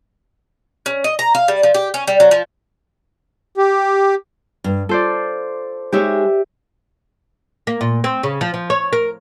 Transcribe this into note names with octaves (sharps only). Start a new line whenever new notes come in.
C#4
D#5
A#5
F5
G3
F3
G4
C#4
G3
F#3
F3
G4
G2
F4 A4 C5 D5
G#3 D#4 G4 C#5 E5
A#3
A#2
C4
C#3
F3
F3
C#5
A#4